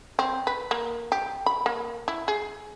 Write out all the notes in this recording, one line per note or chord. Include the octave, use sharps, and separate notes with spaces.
C4
B4
A#3
G4
B5
A#3
E4
G#4